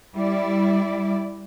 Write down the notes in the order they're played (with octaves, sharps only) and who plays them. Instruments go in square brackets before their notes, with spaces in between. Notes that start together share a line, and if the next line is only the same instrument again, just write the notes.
[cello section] G3 E4 D5